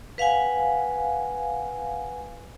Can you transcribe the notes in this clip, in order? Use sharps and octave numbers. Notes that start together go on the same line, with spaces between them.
B4 F5 F#5 G#5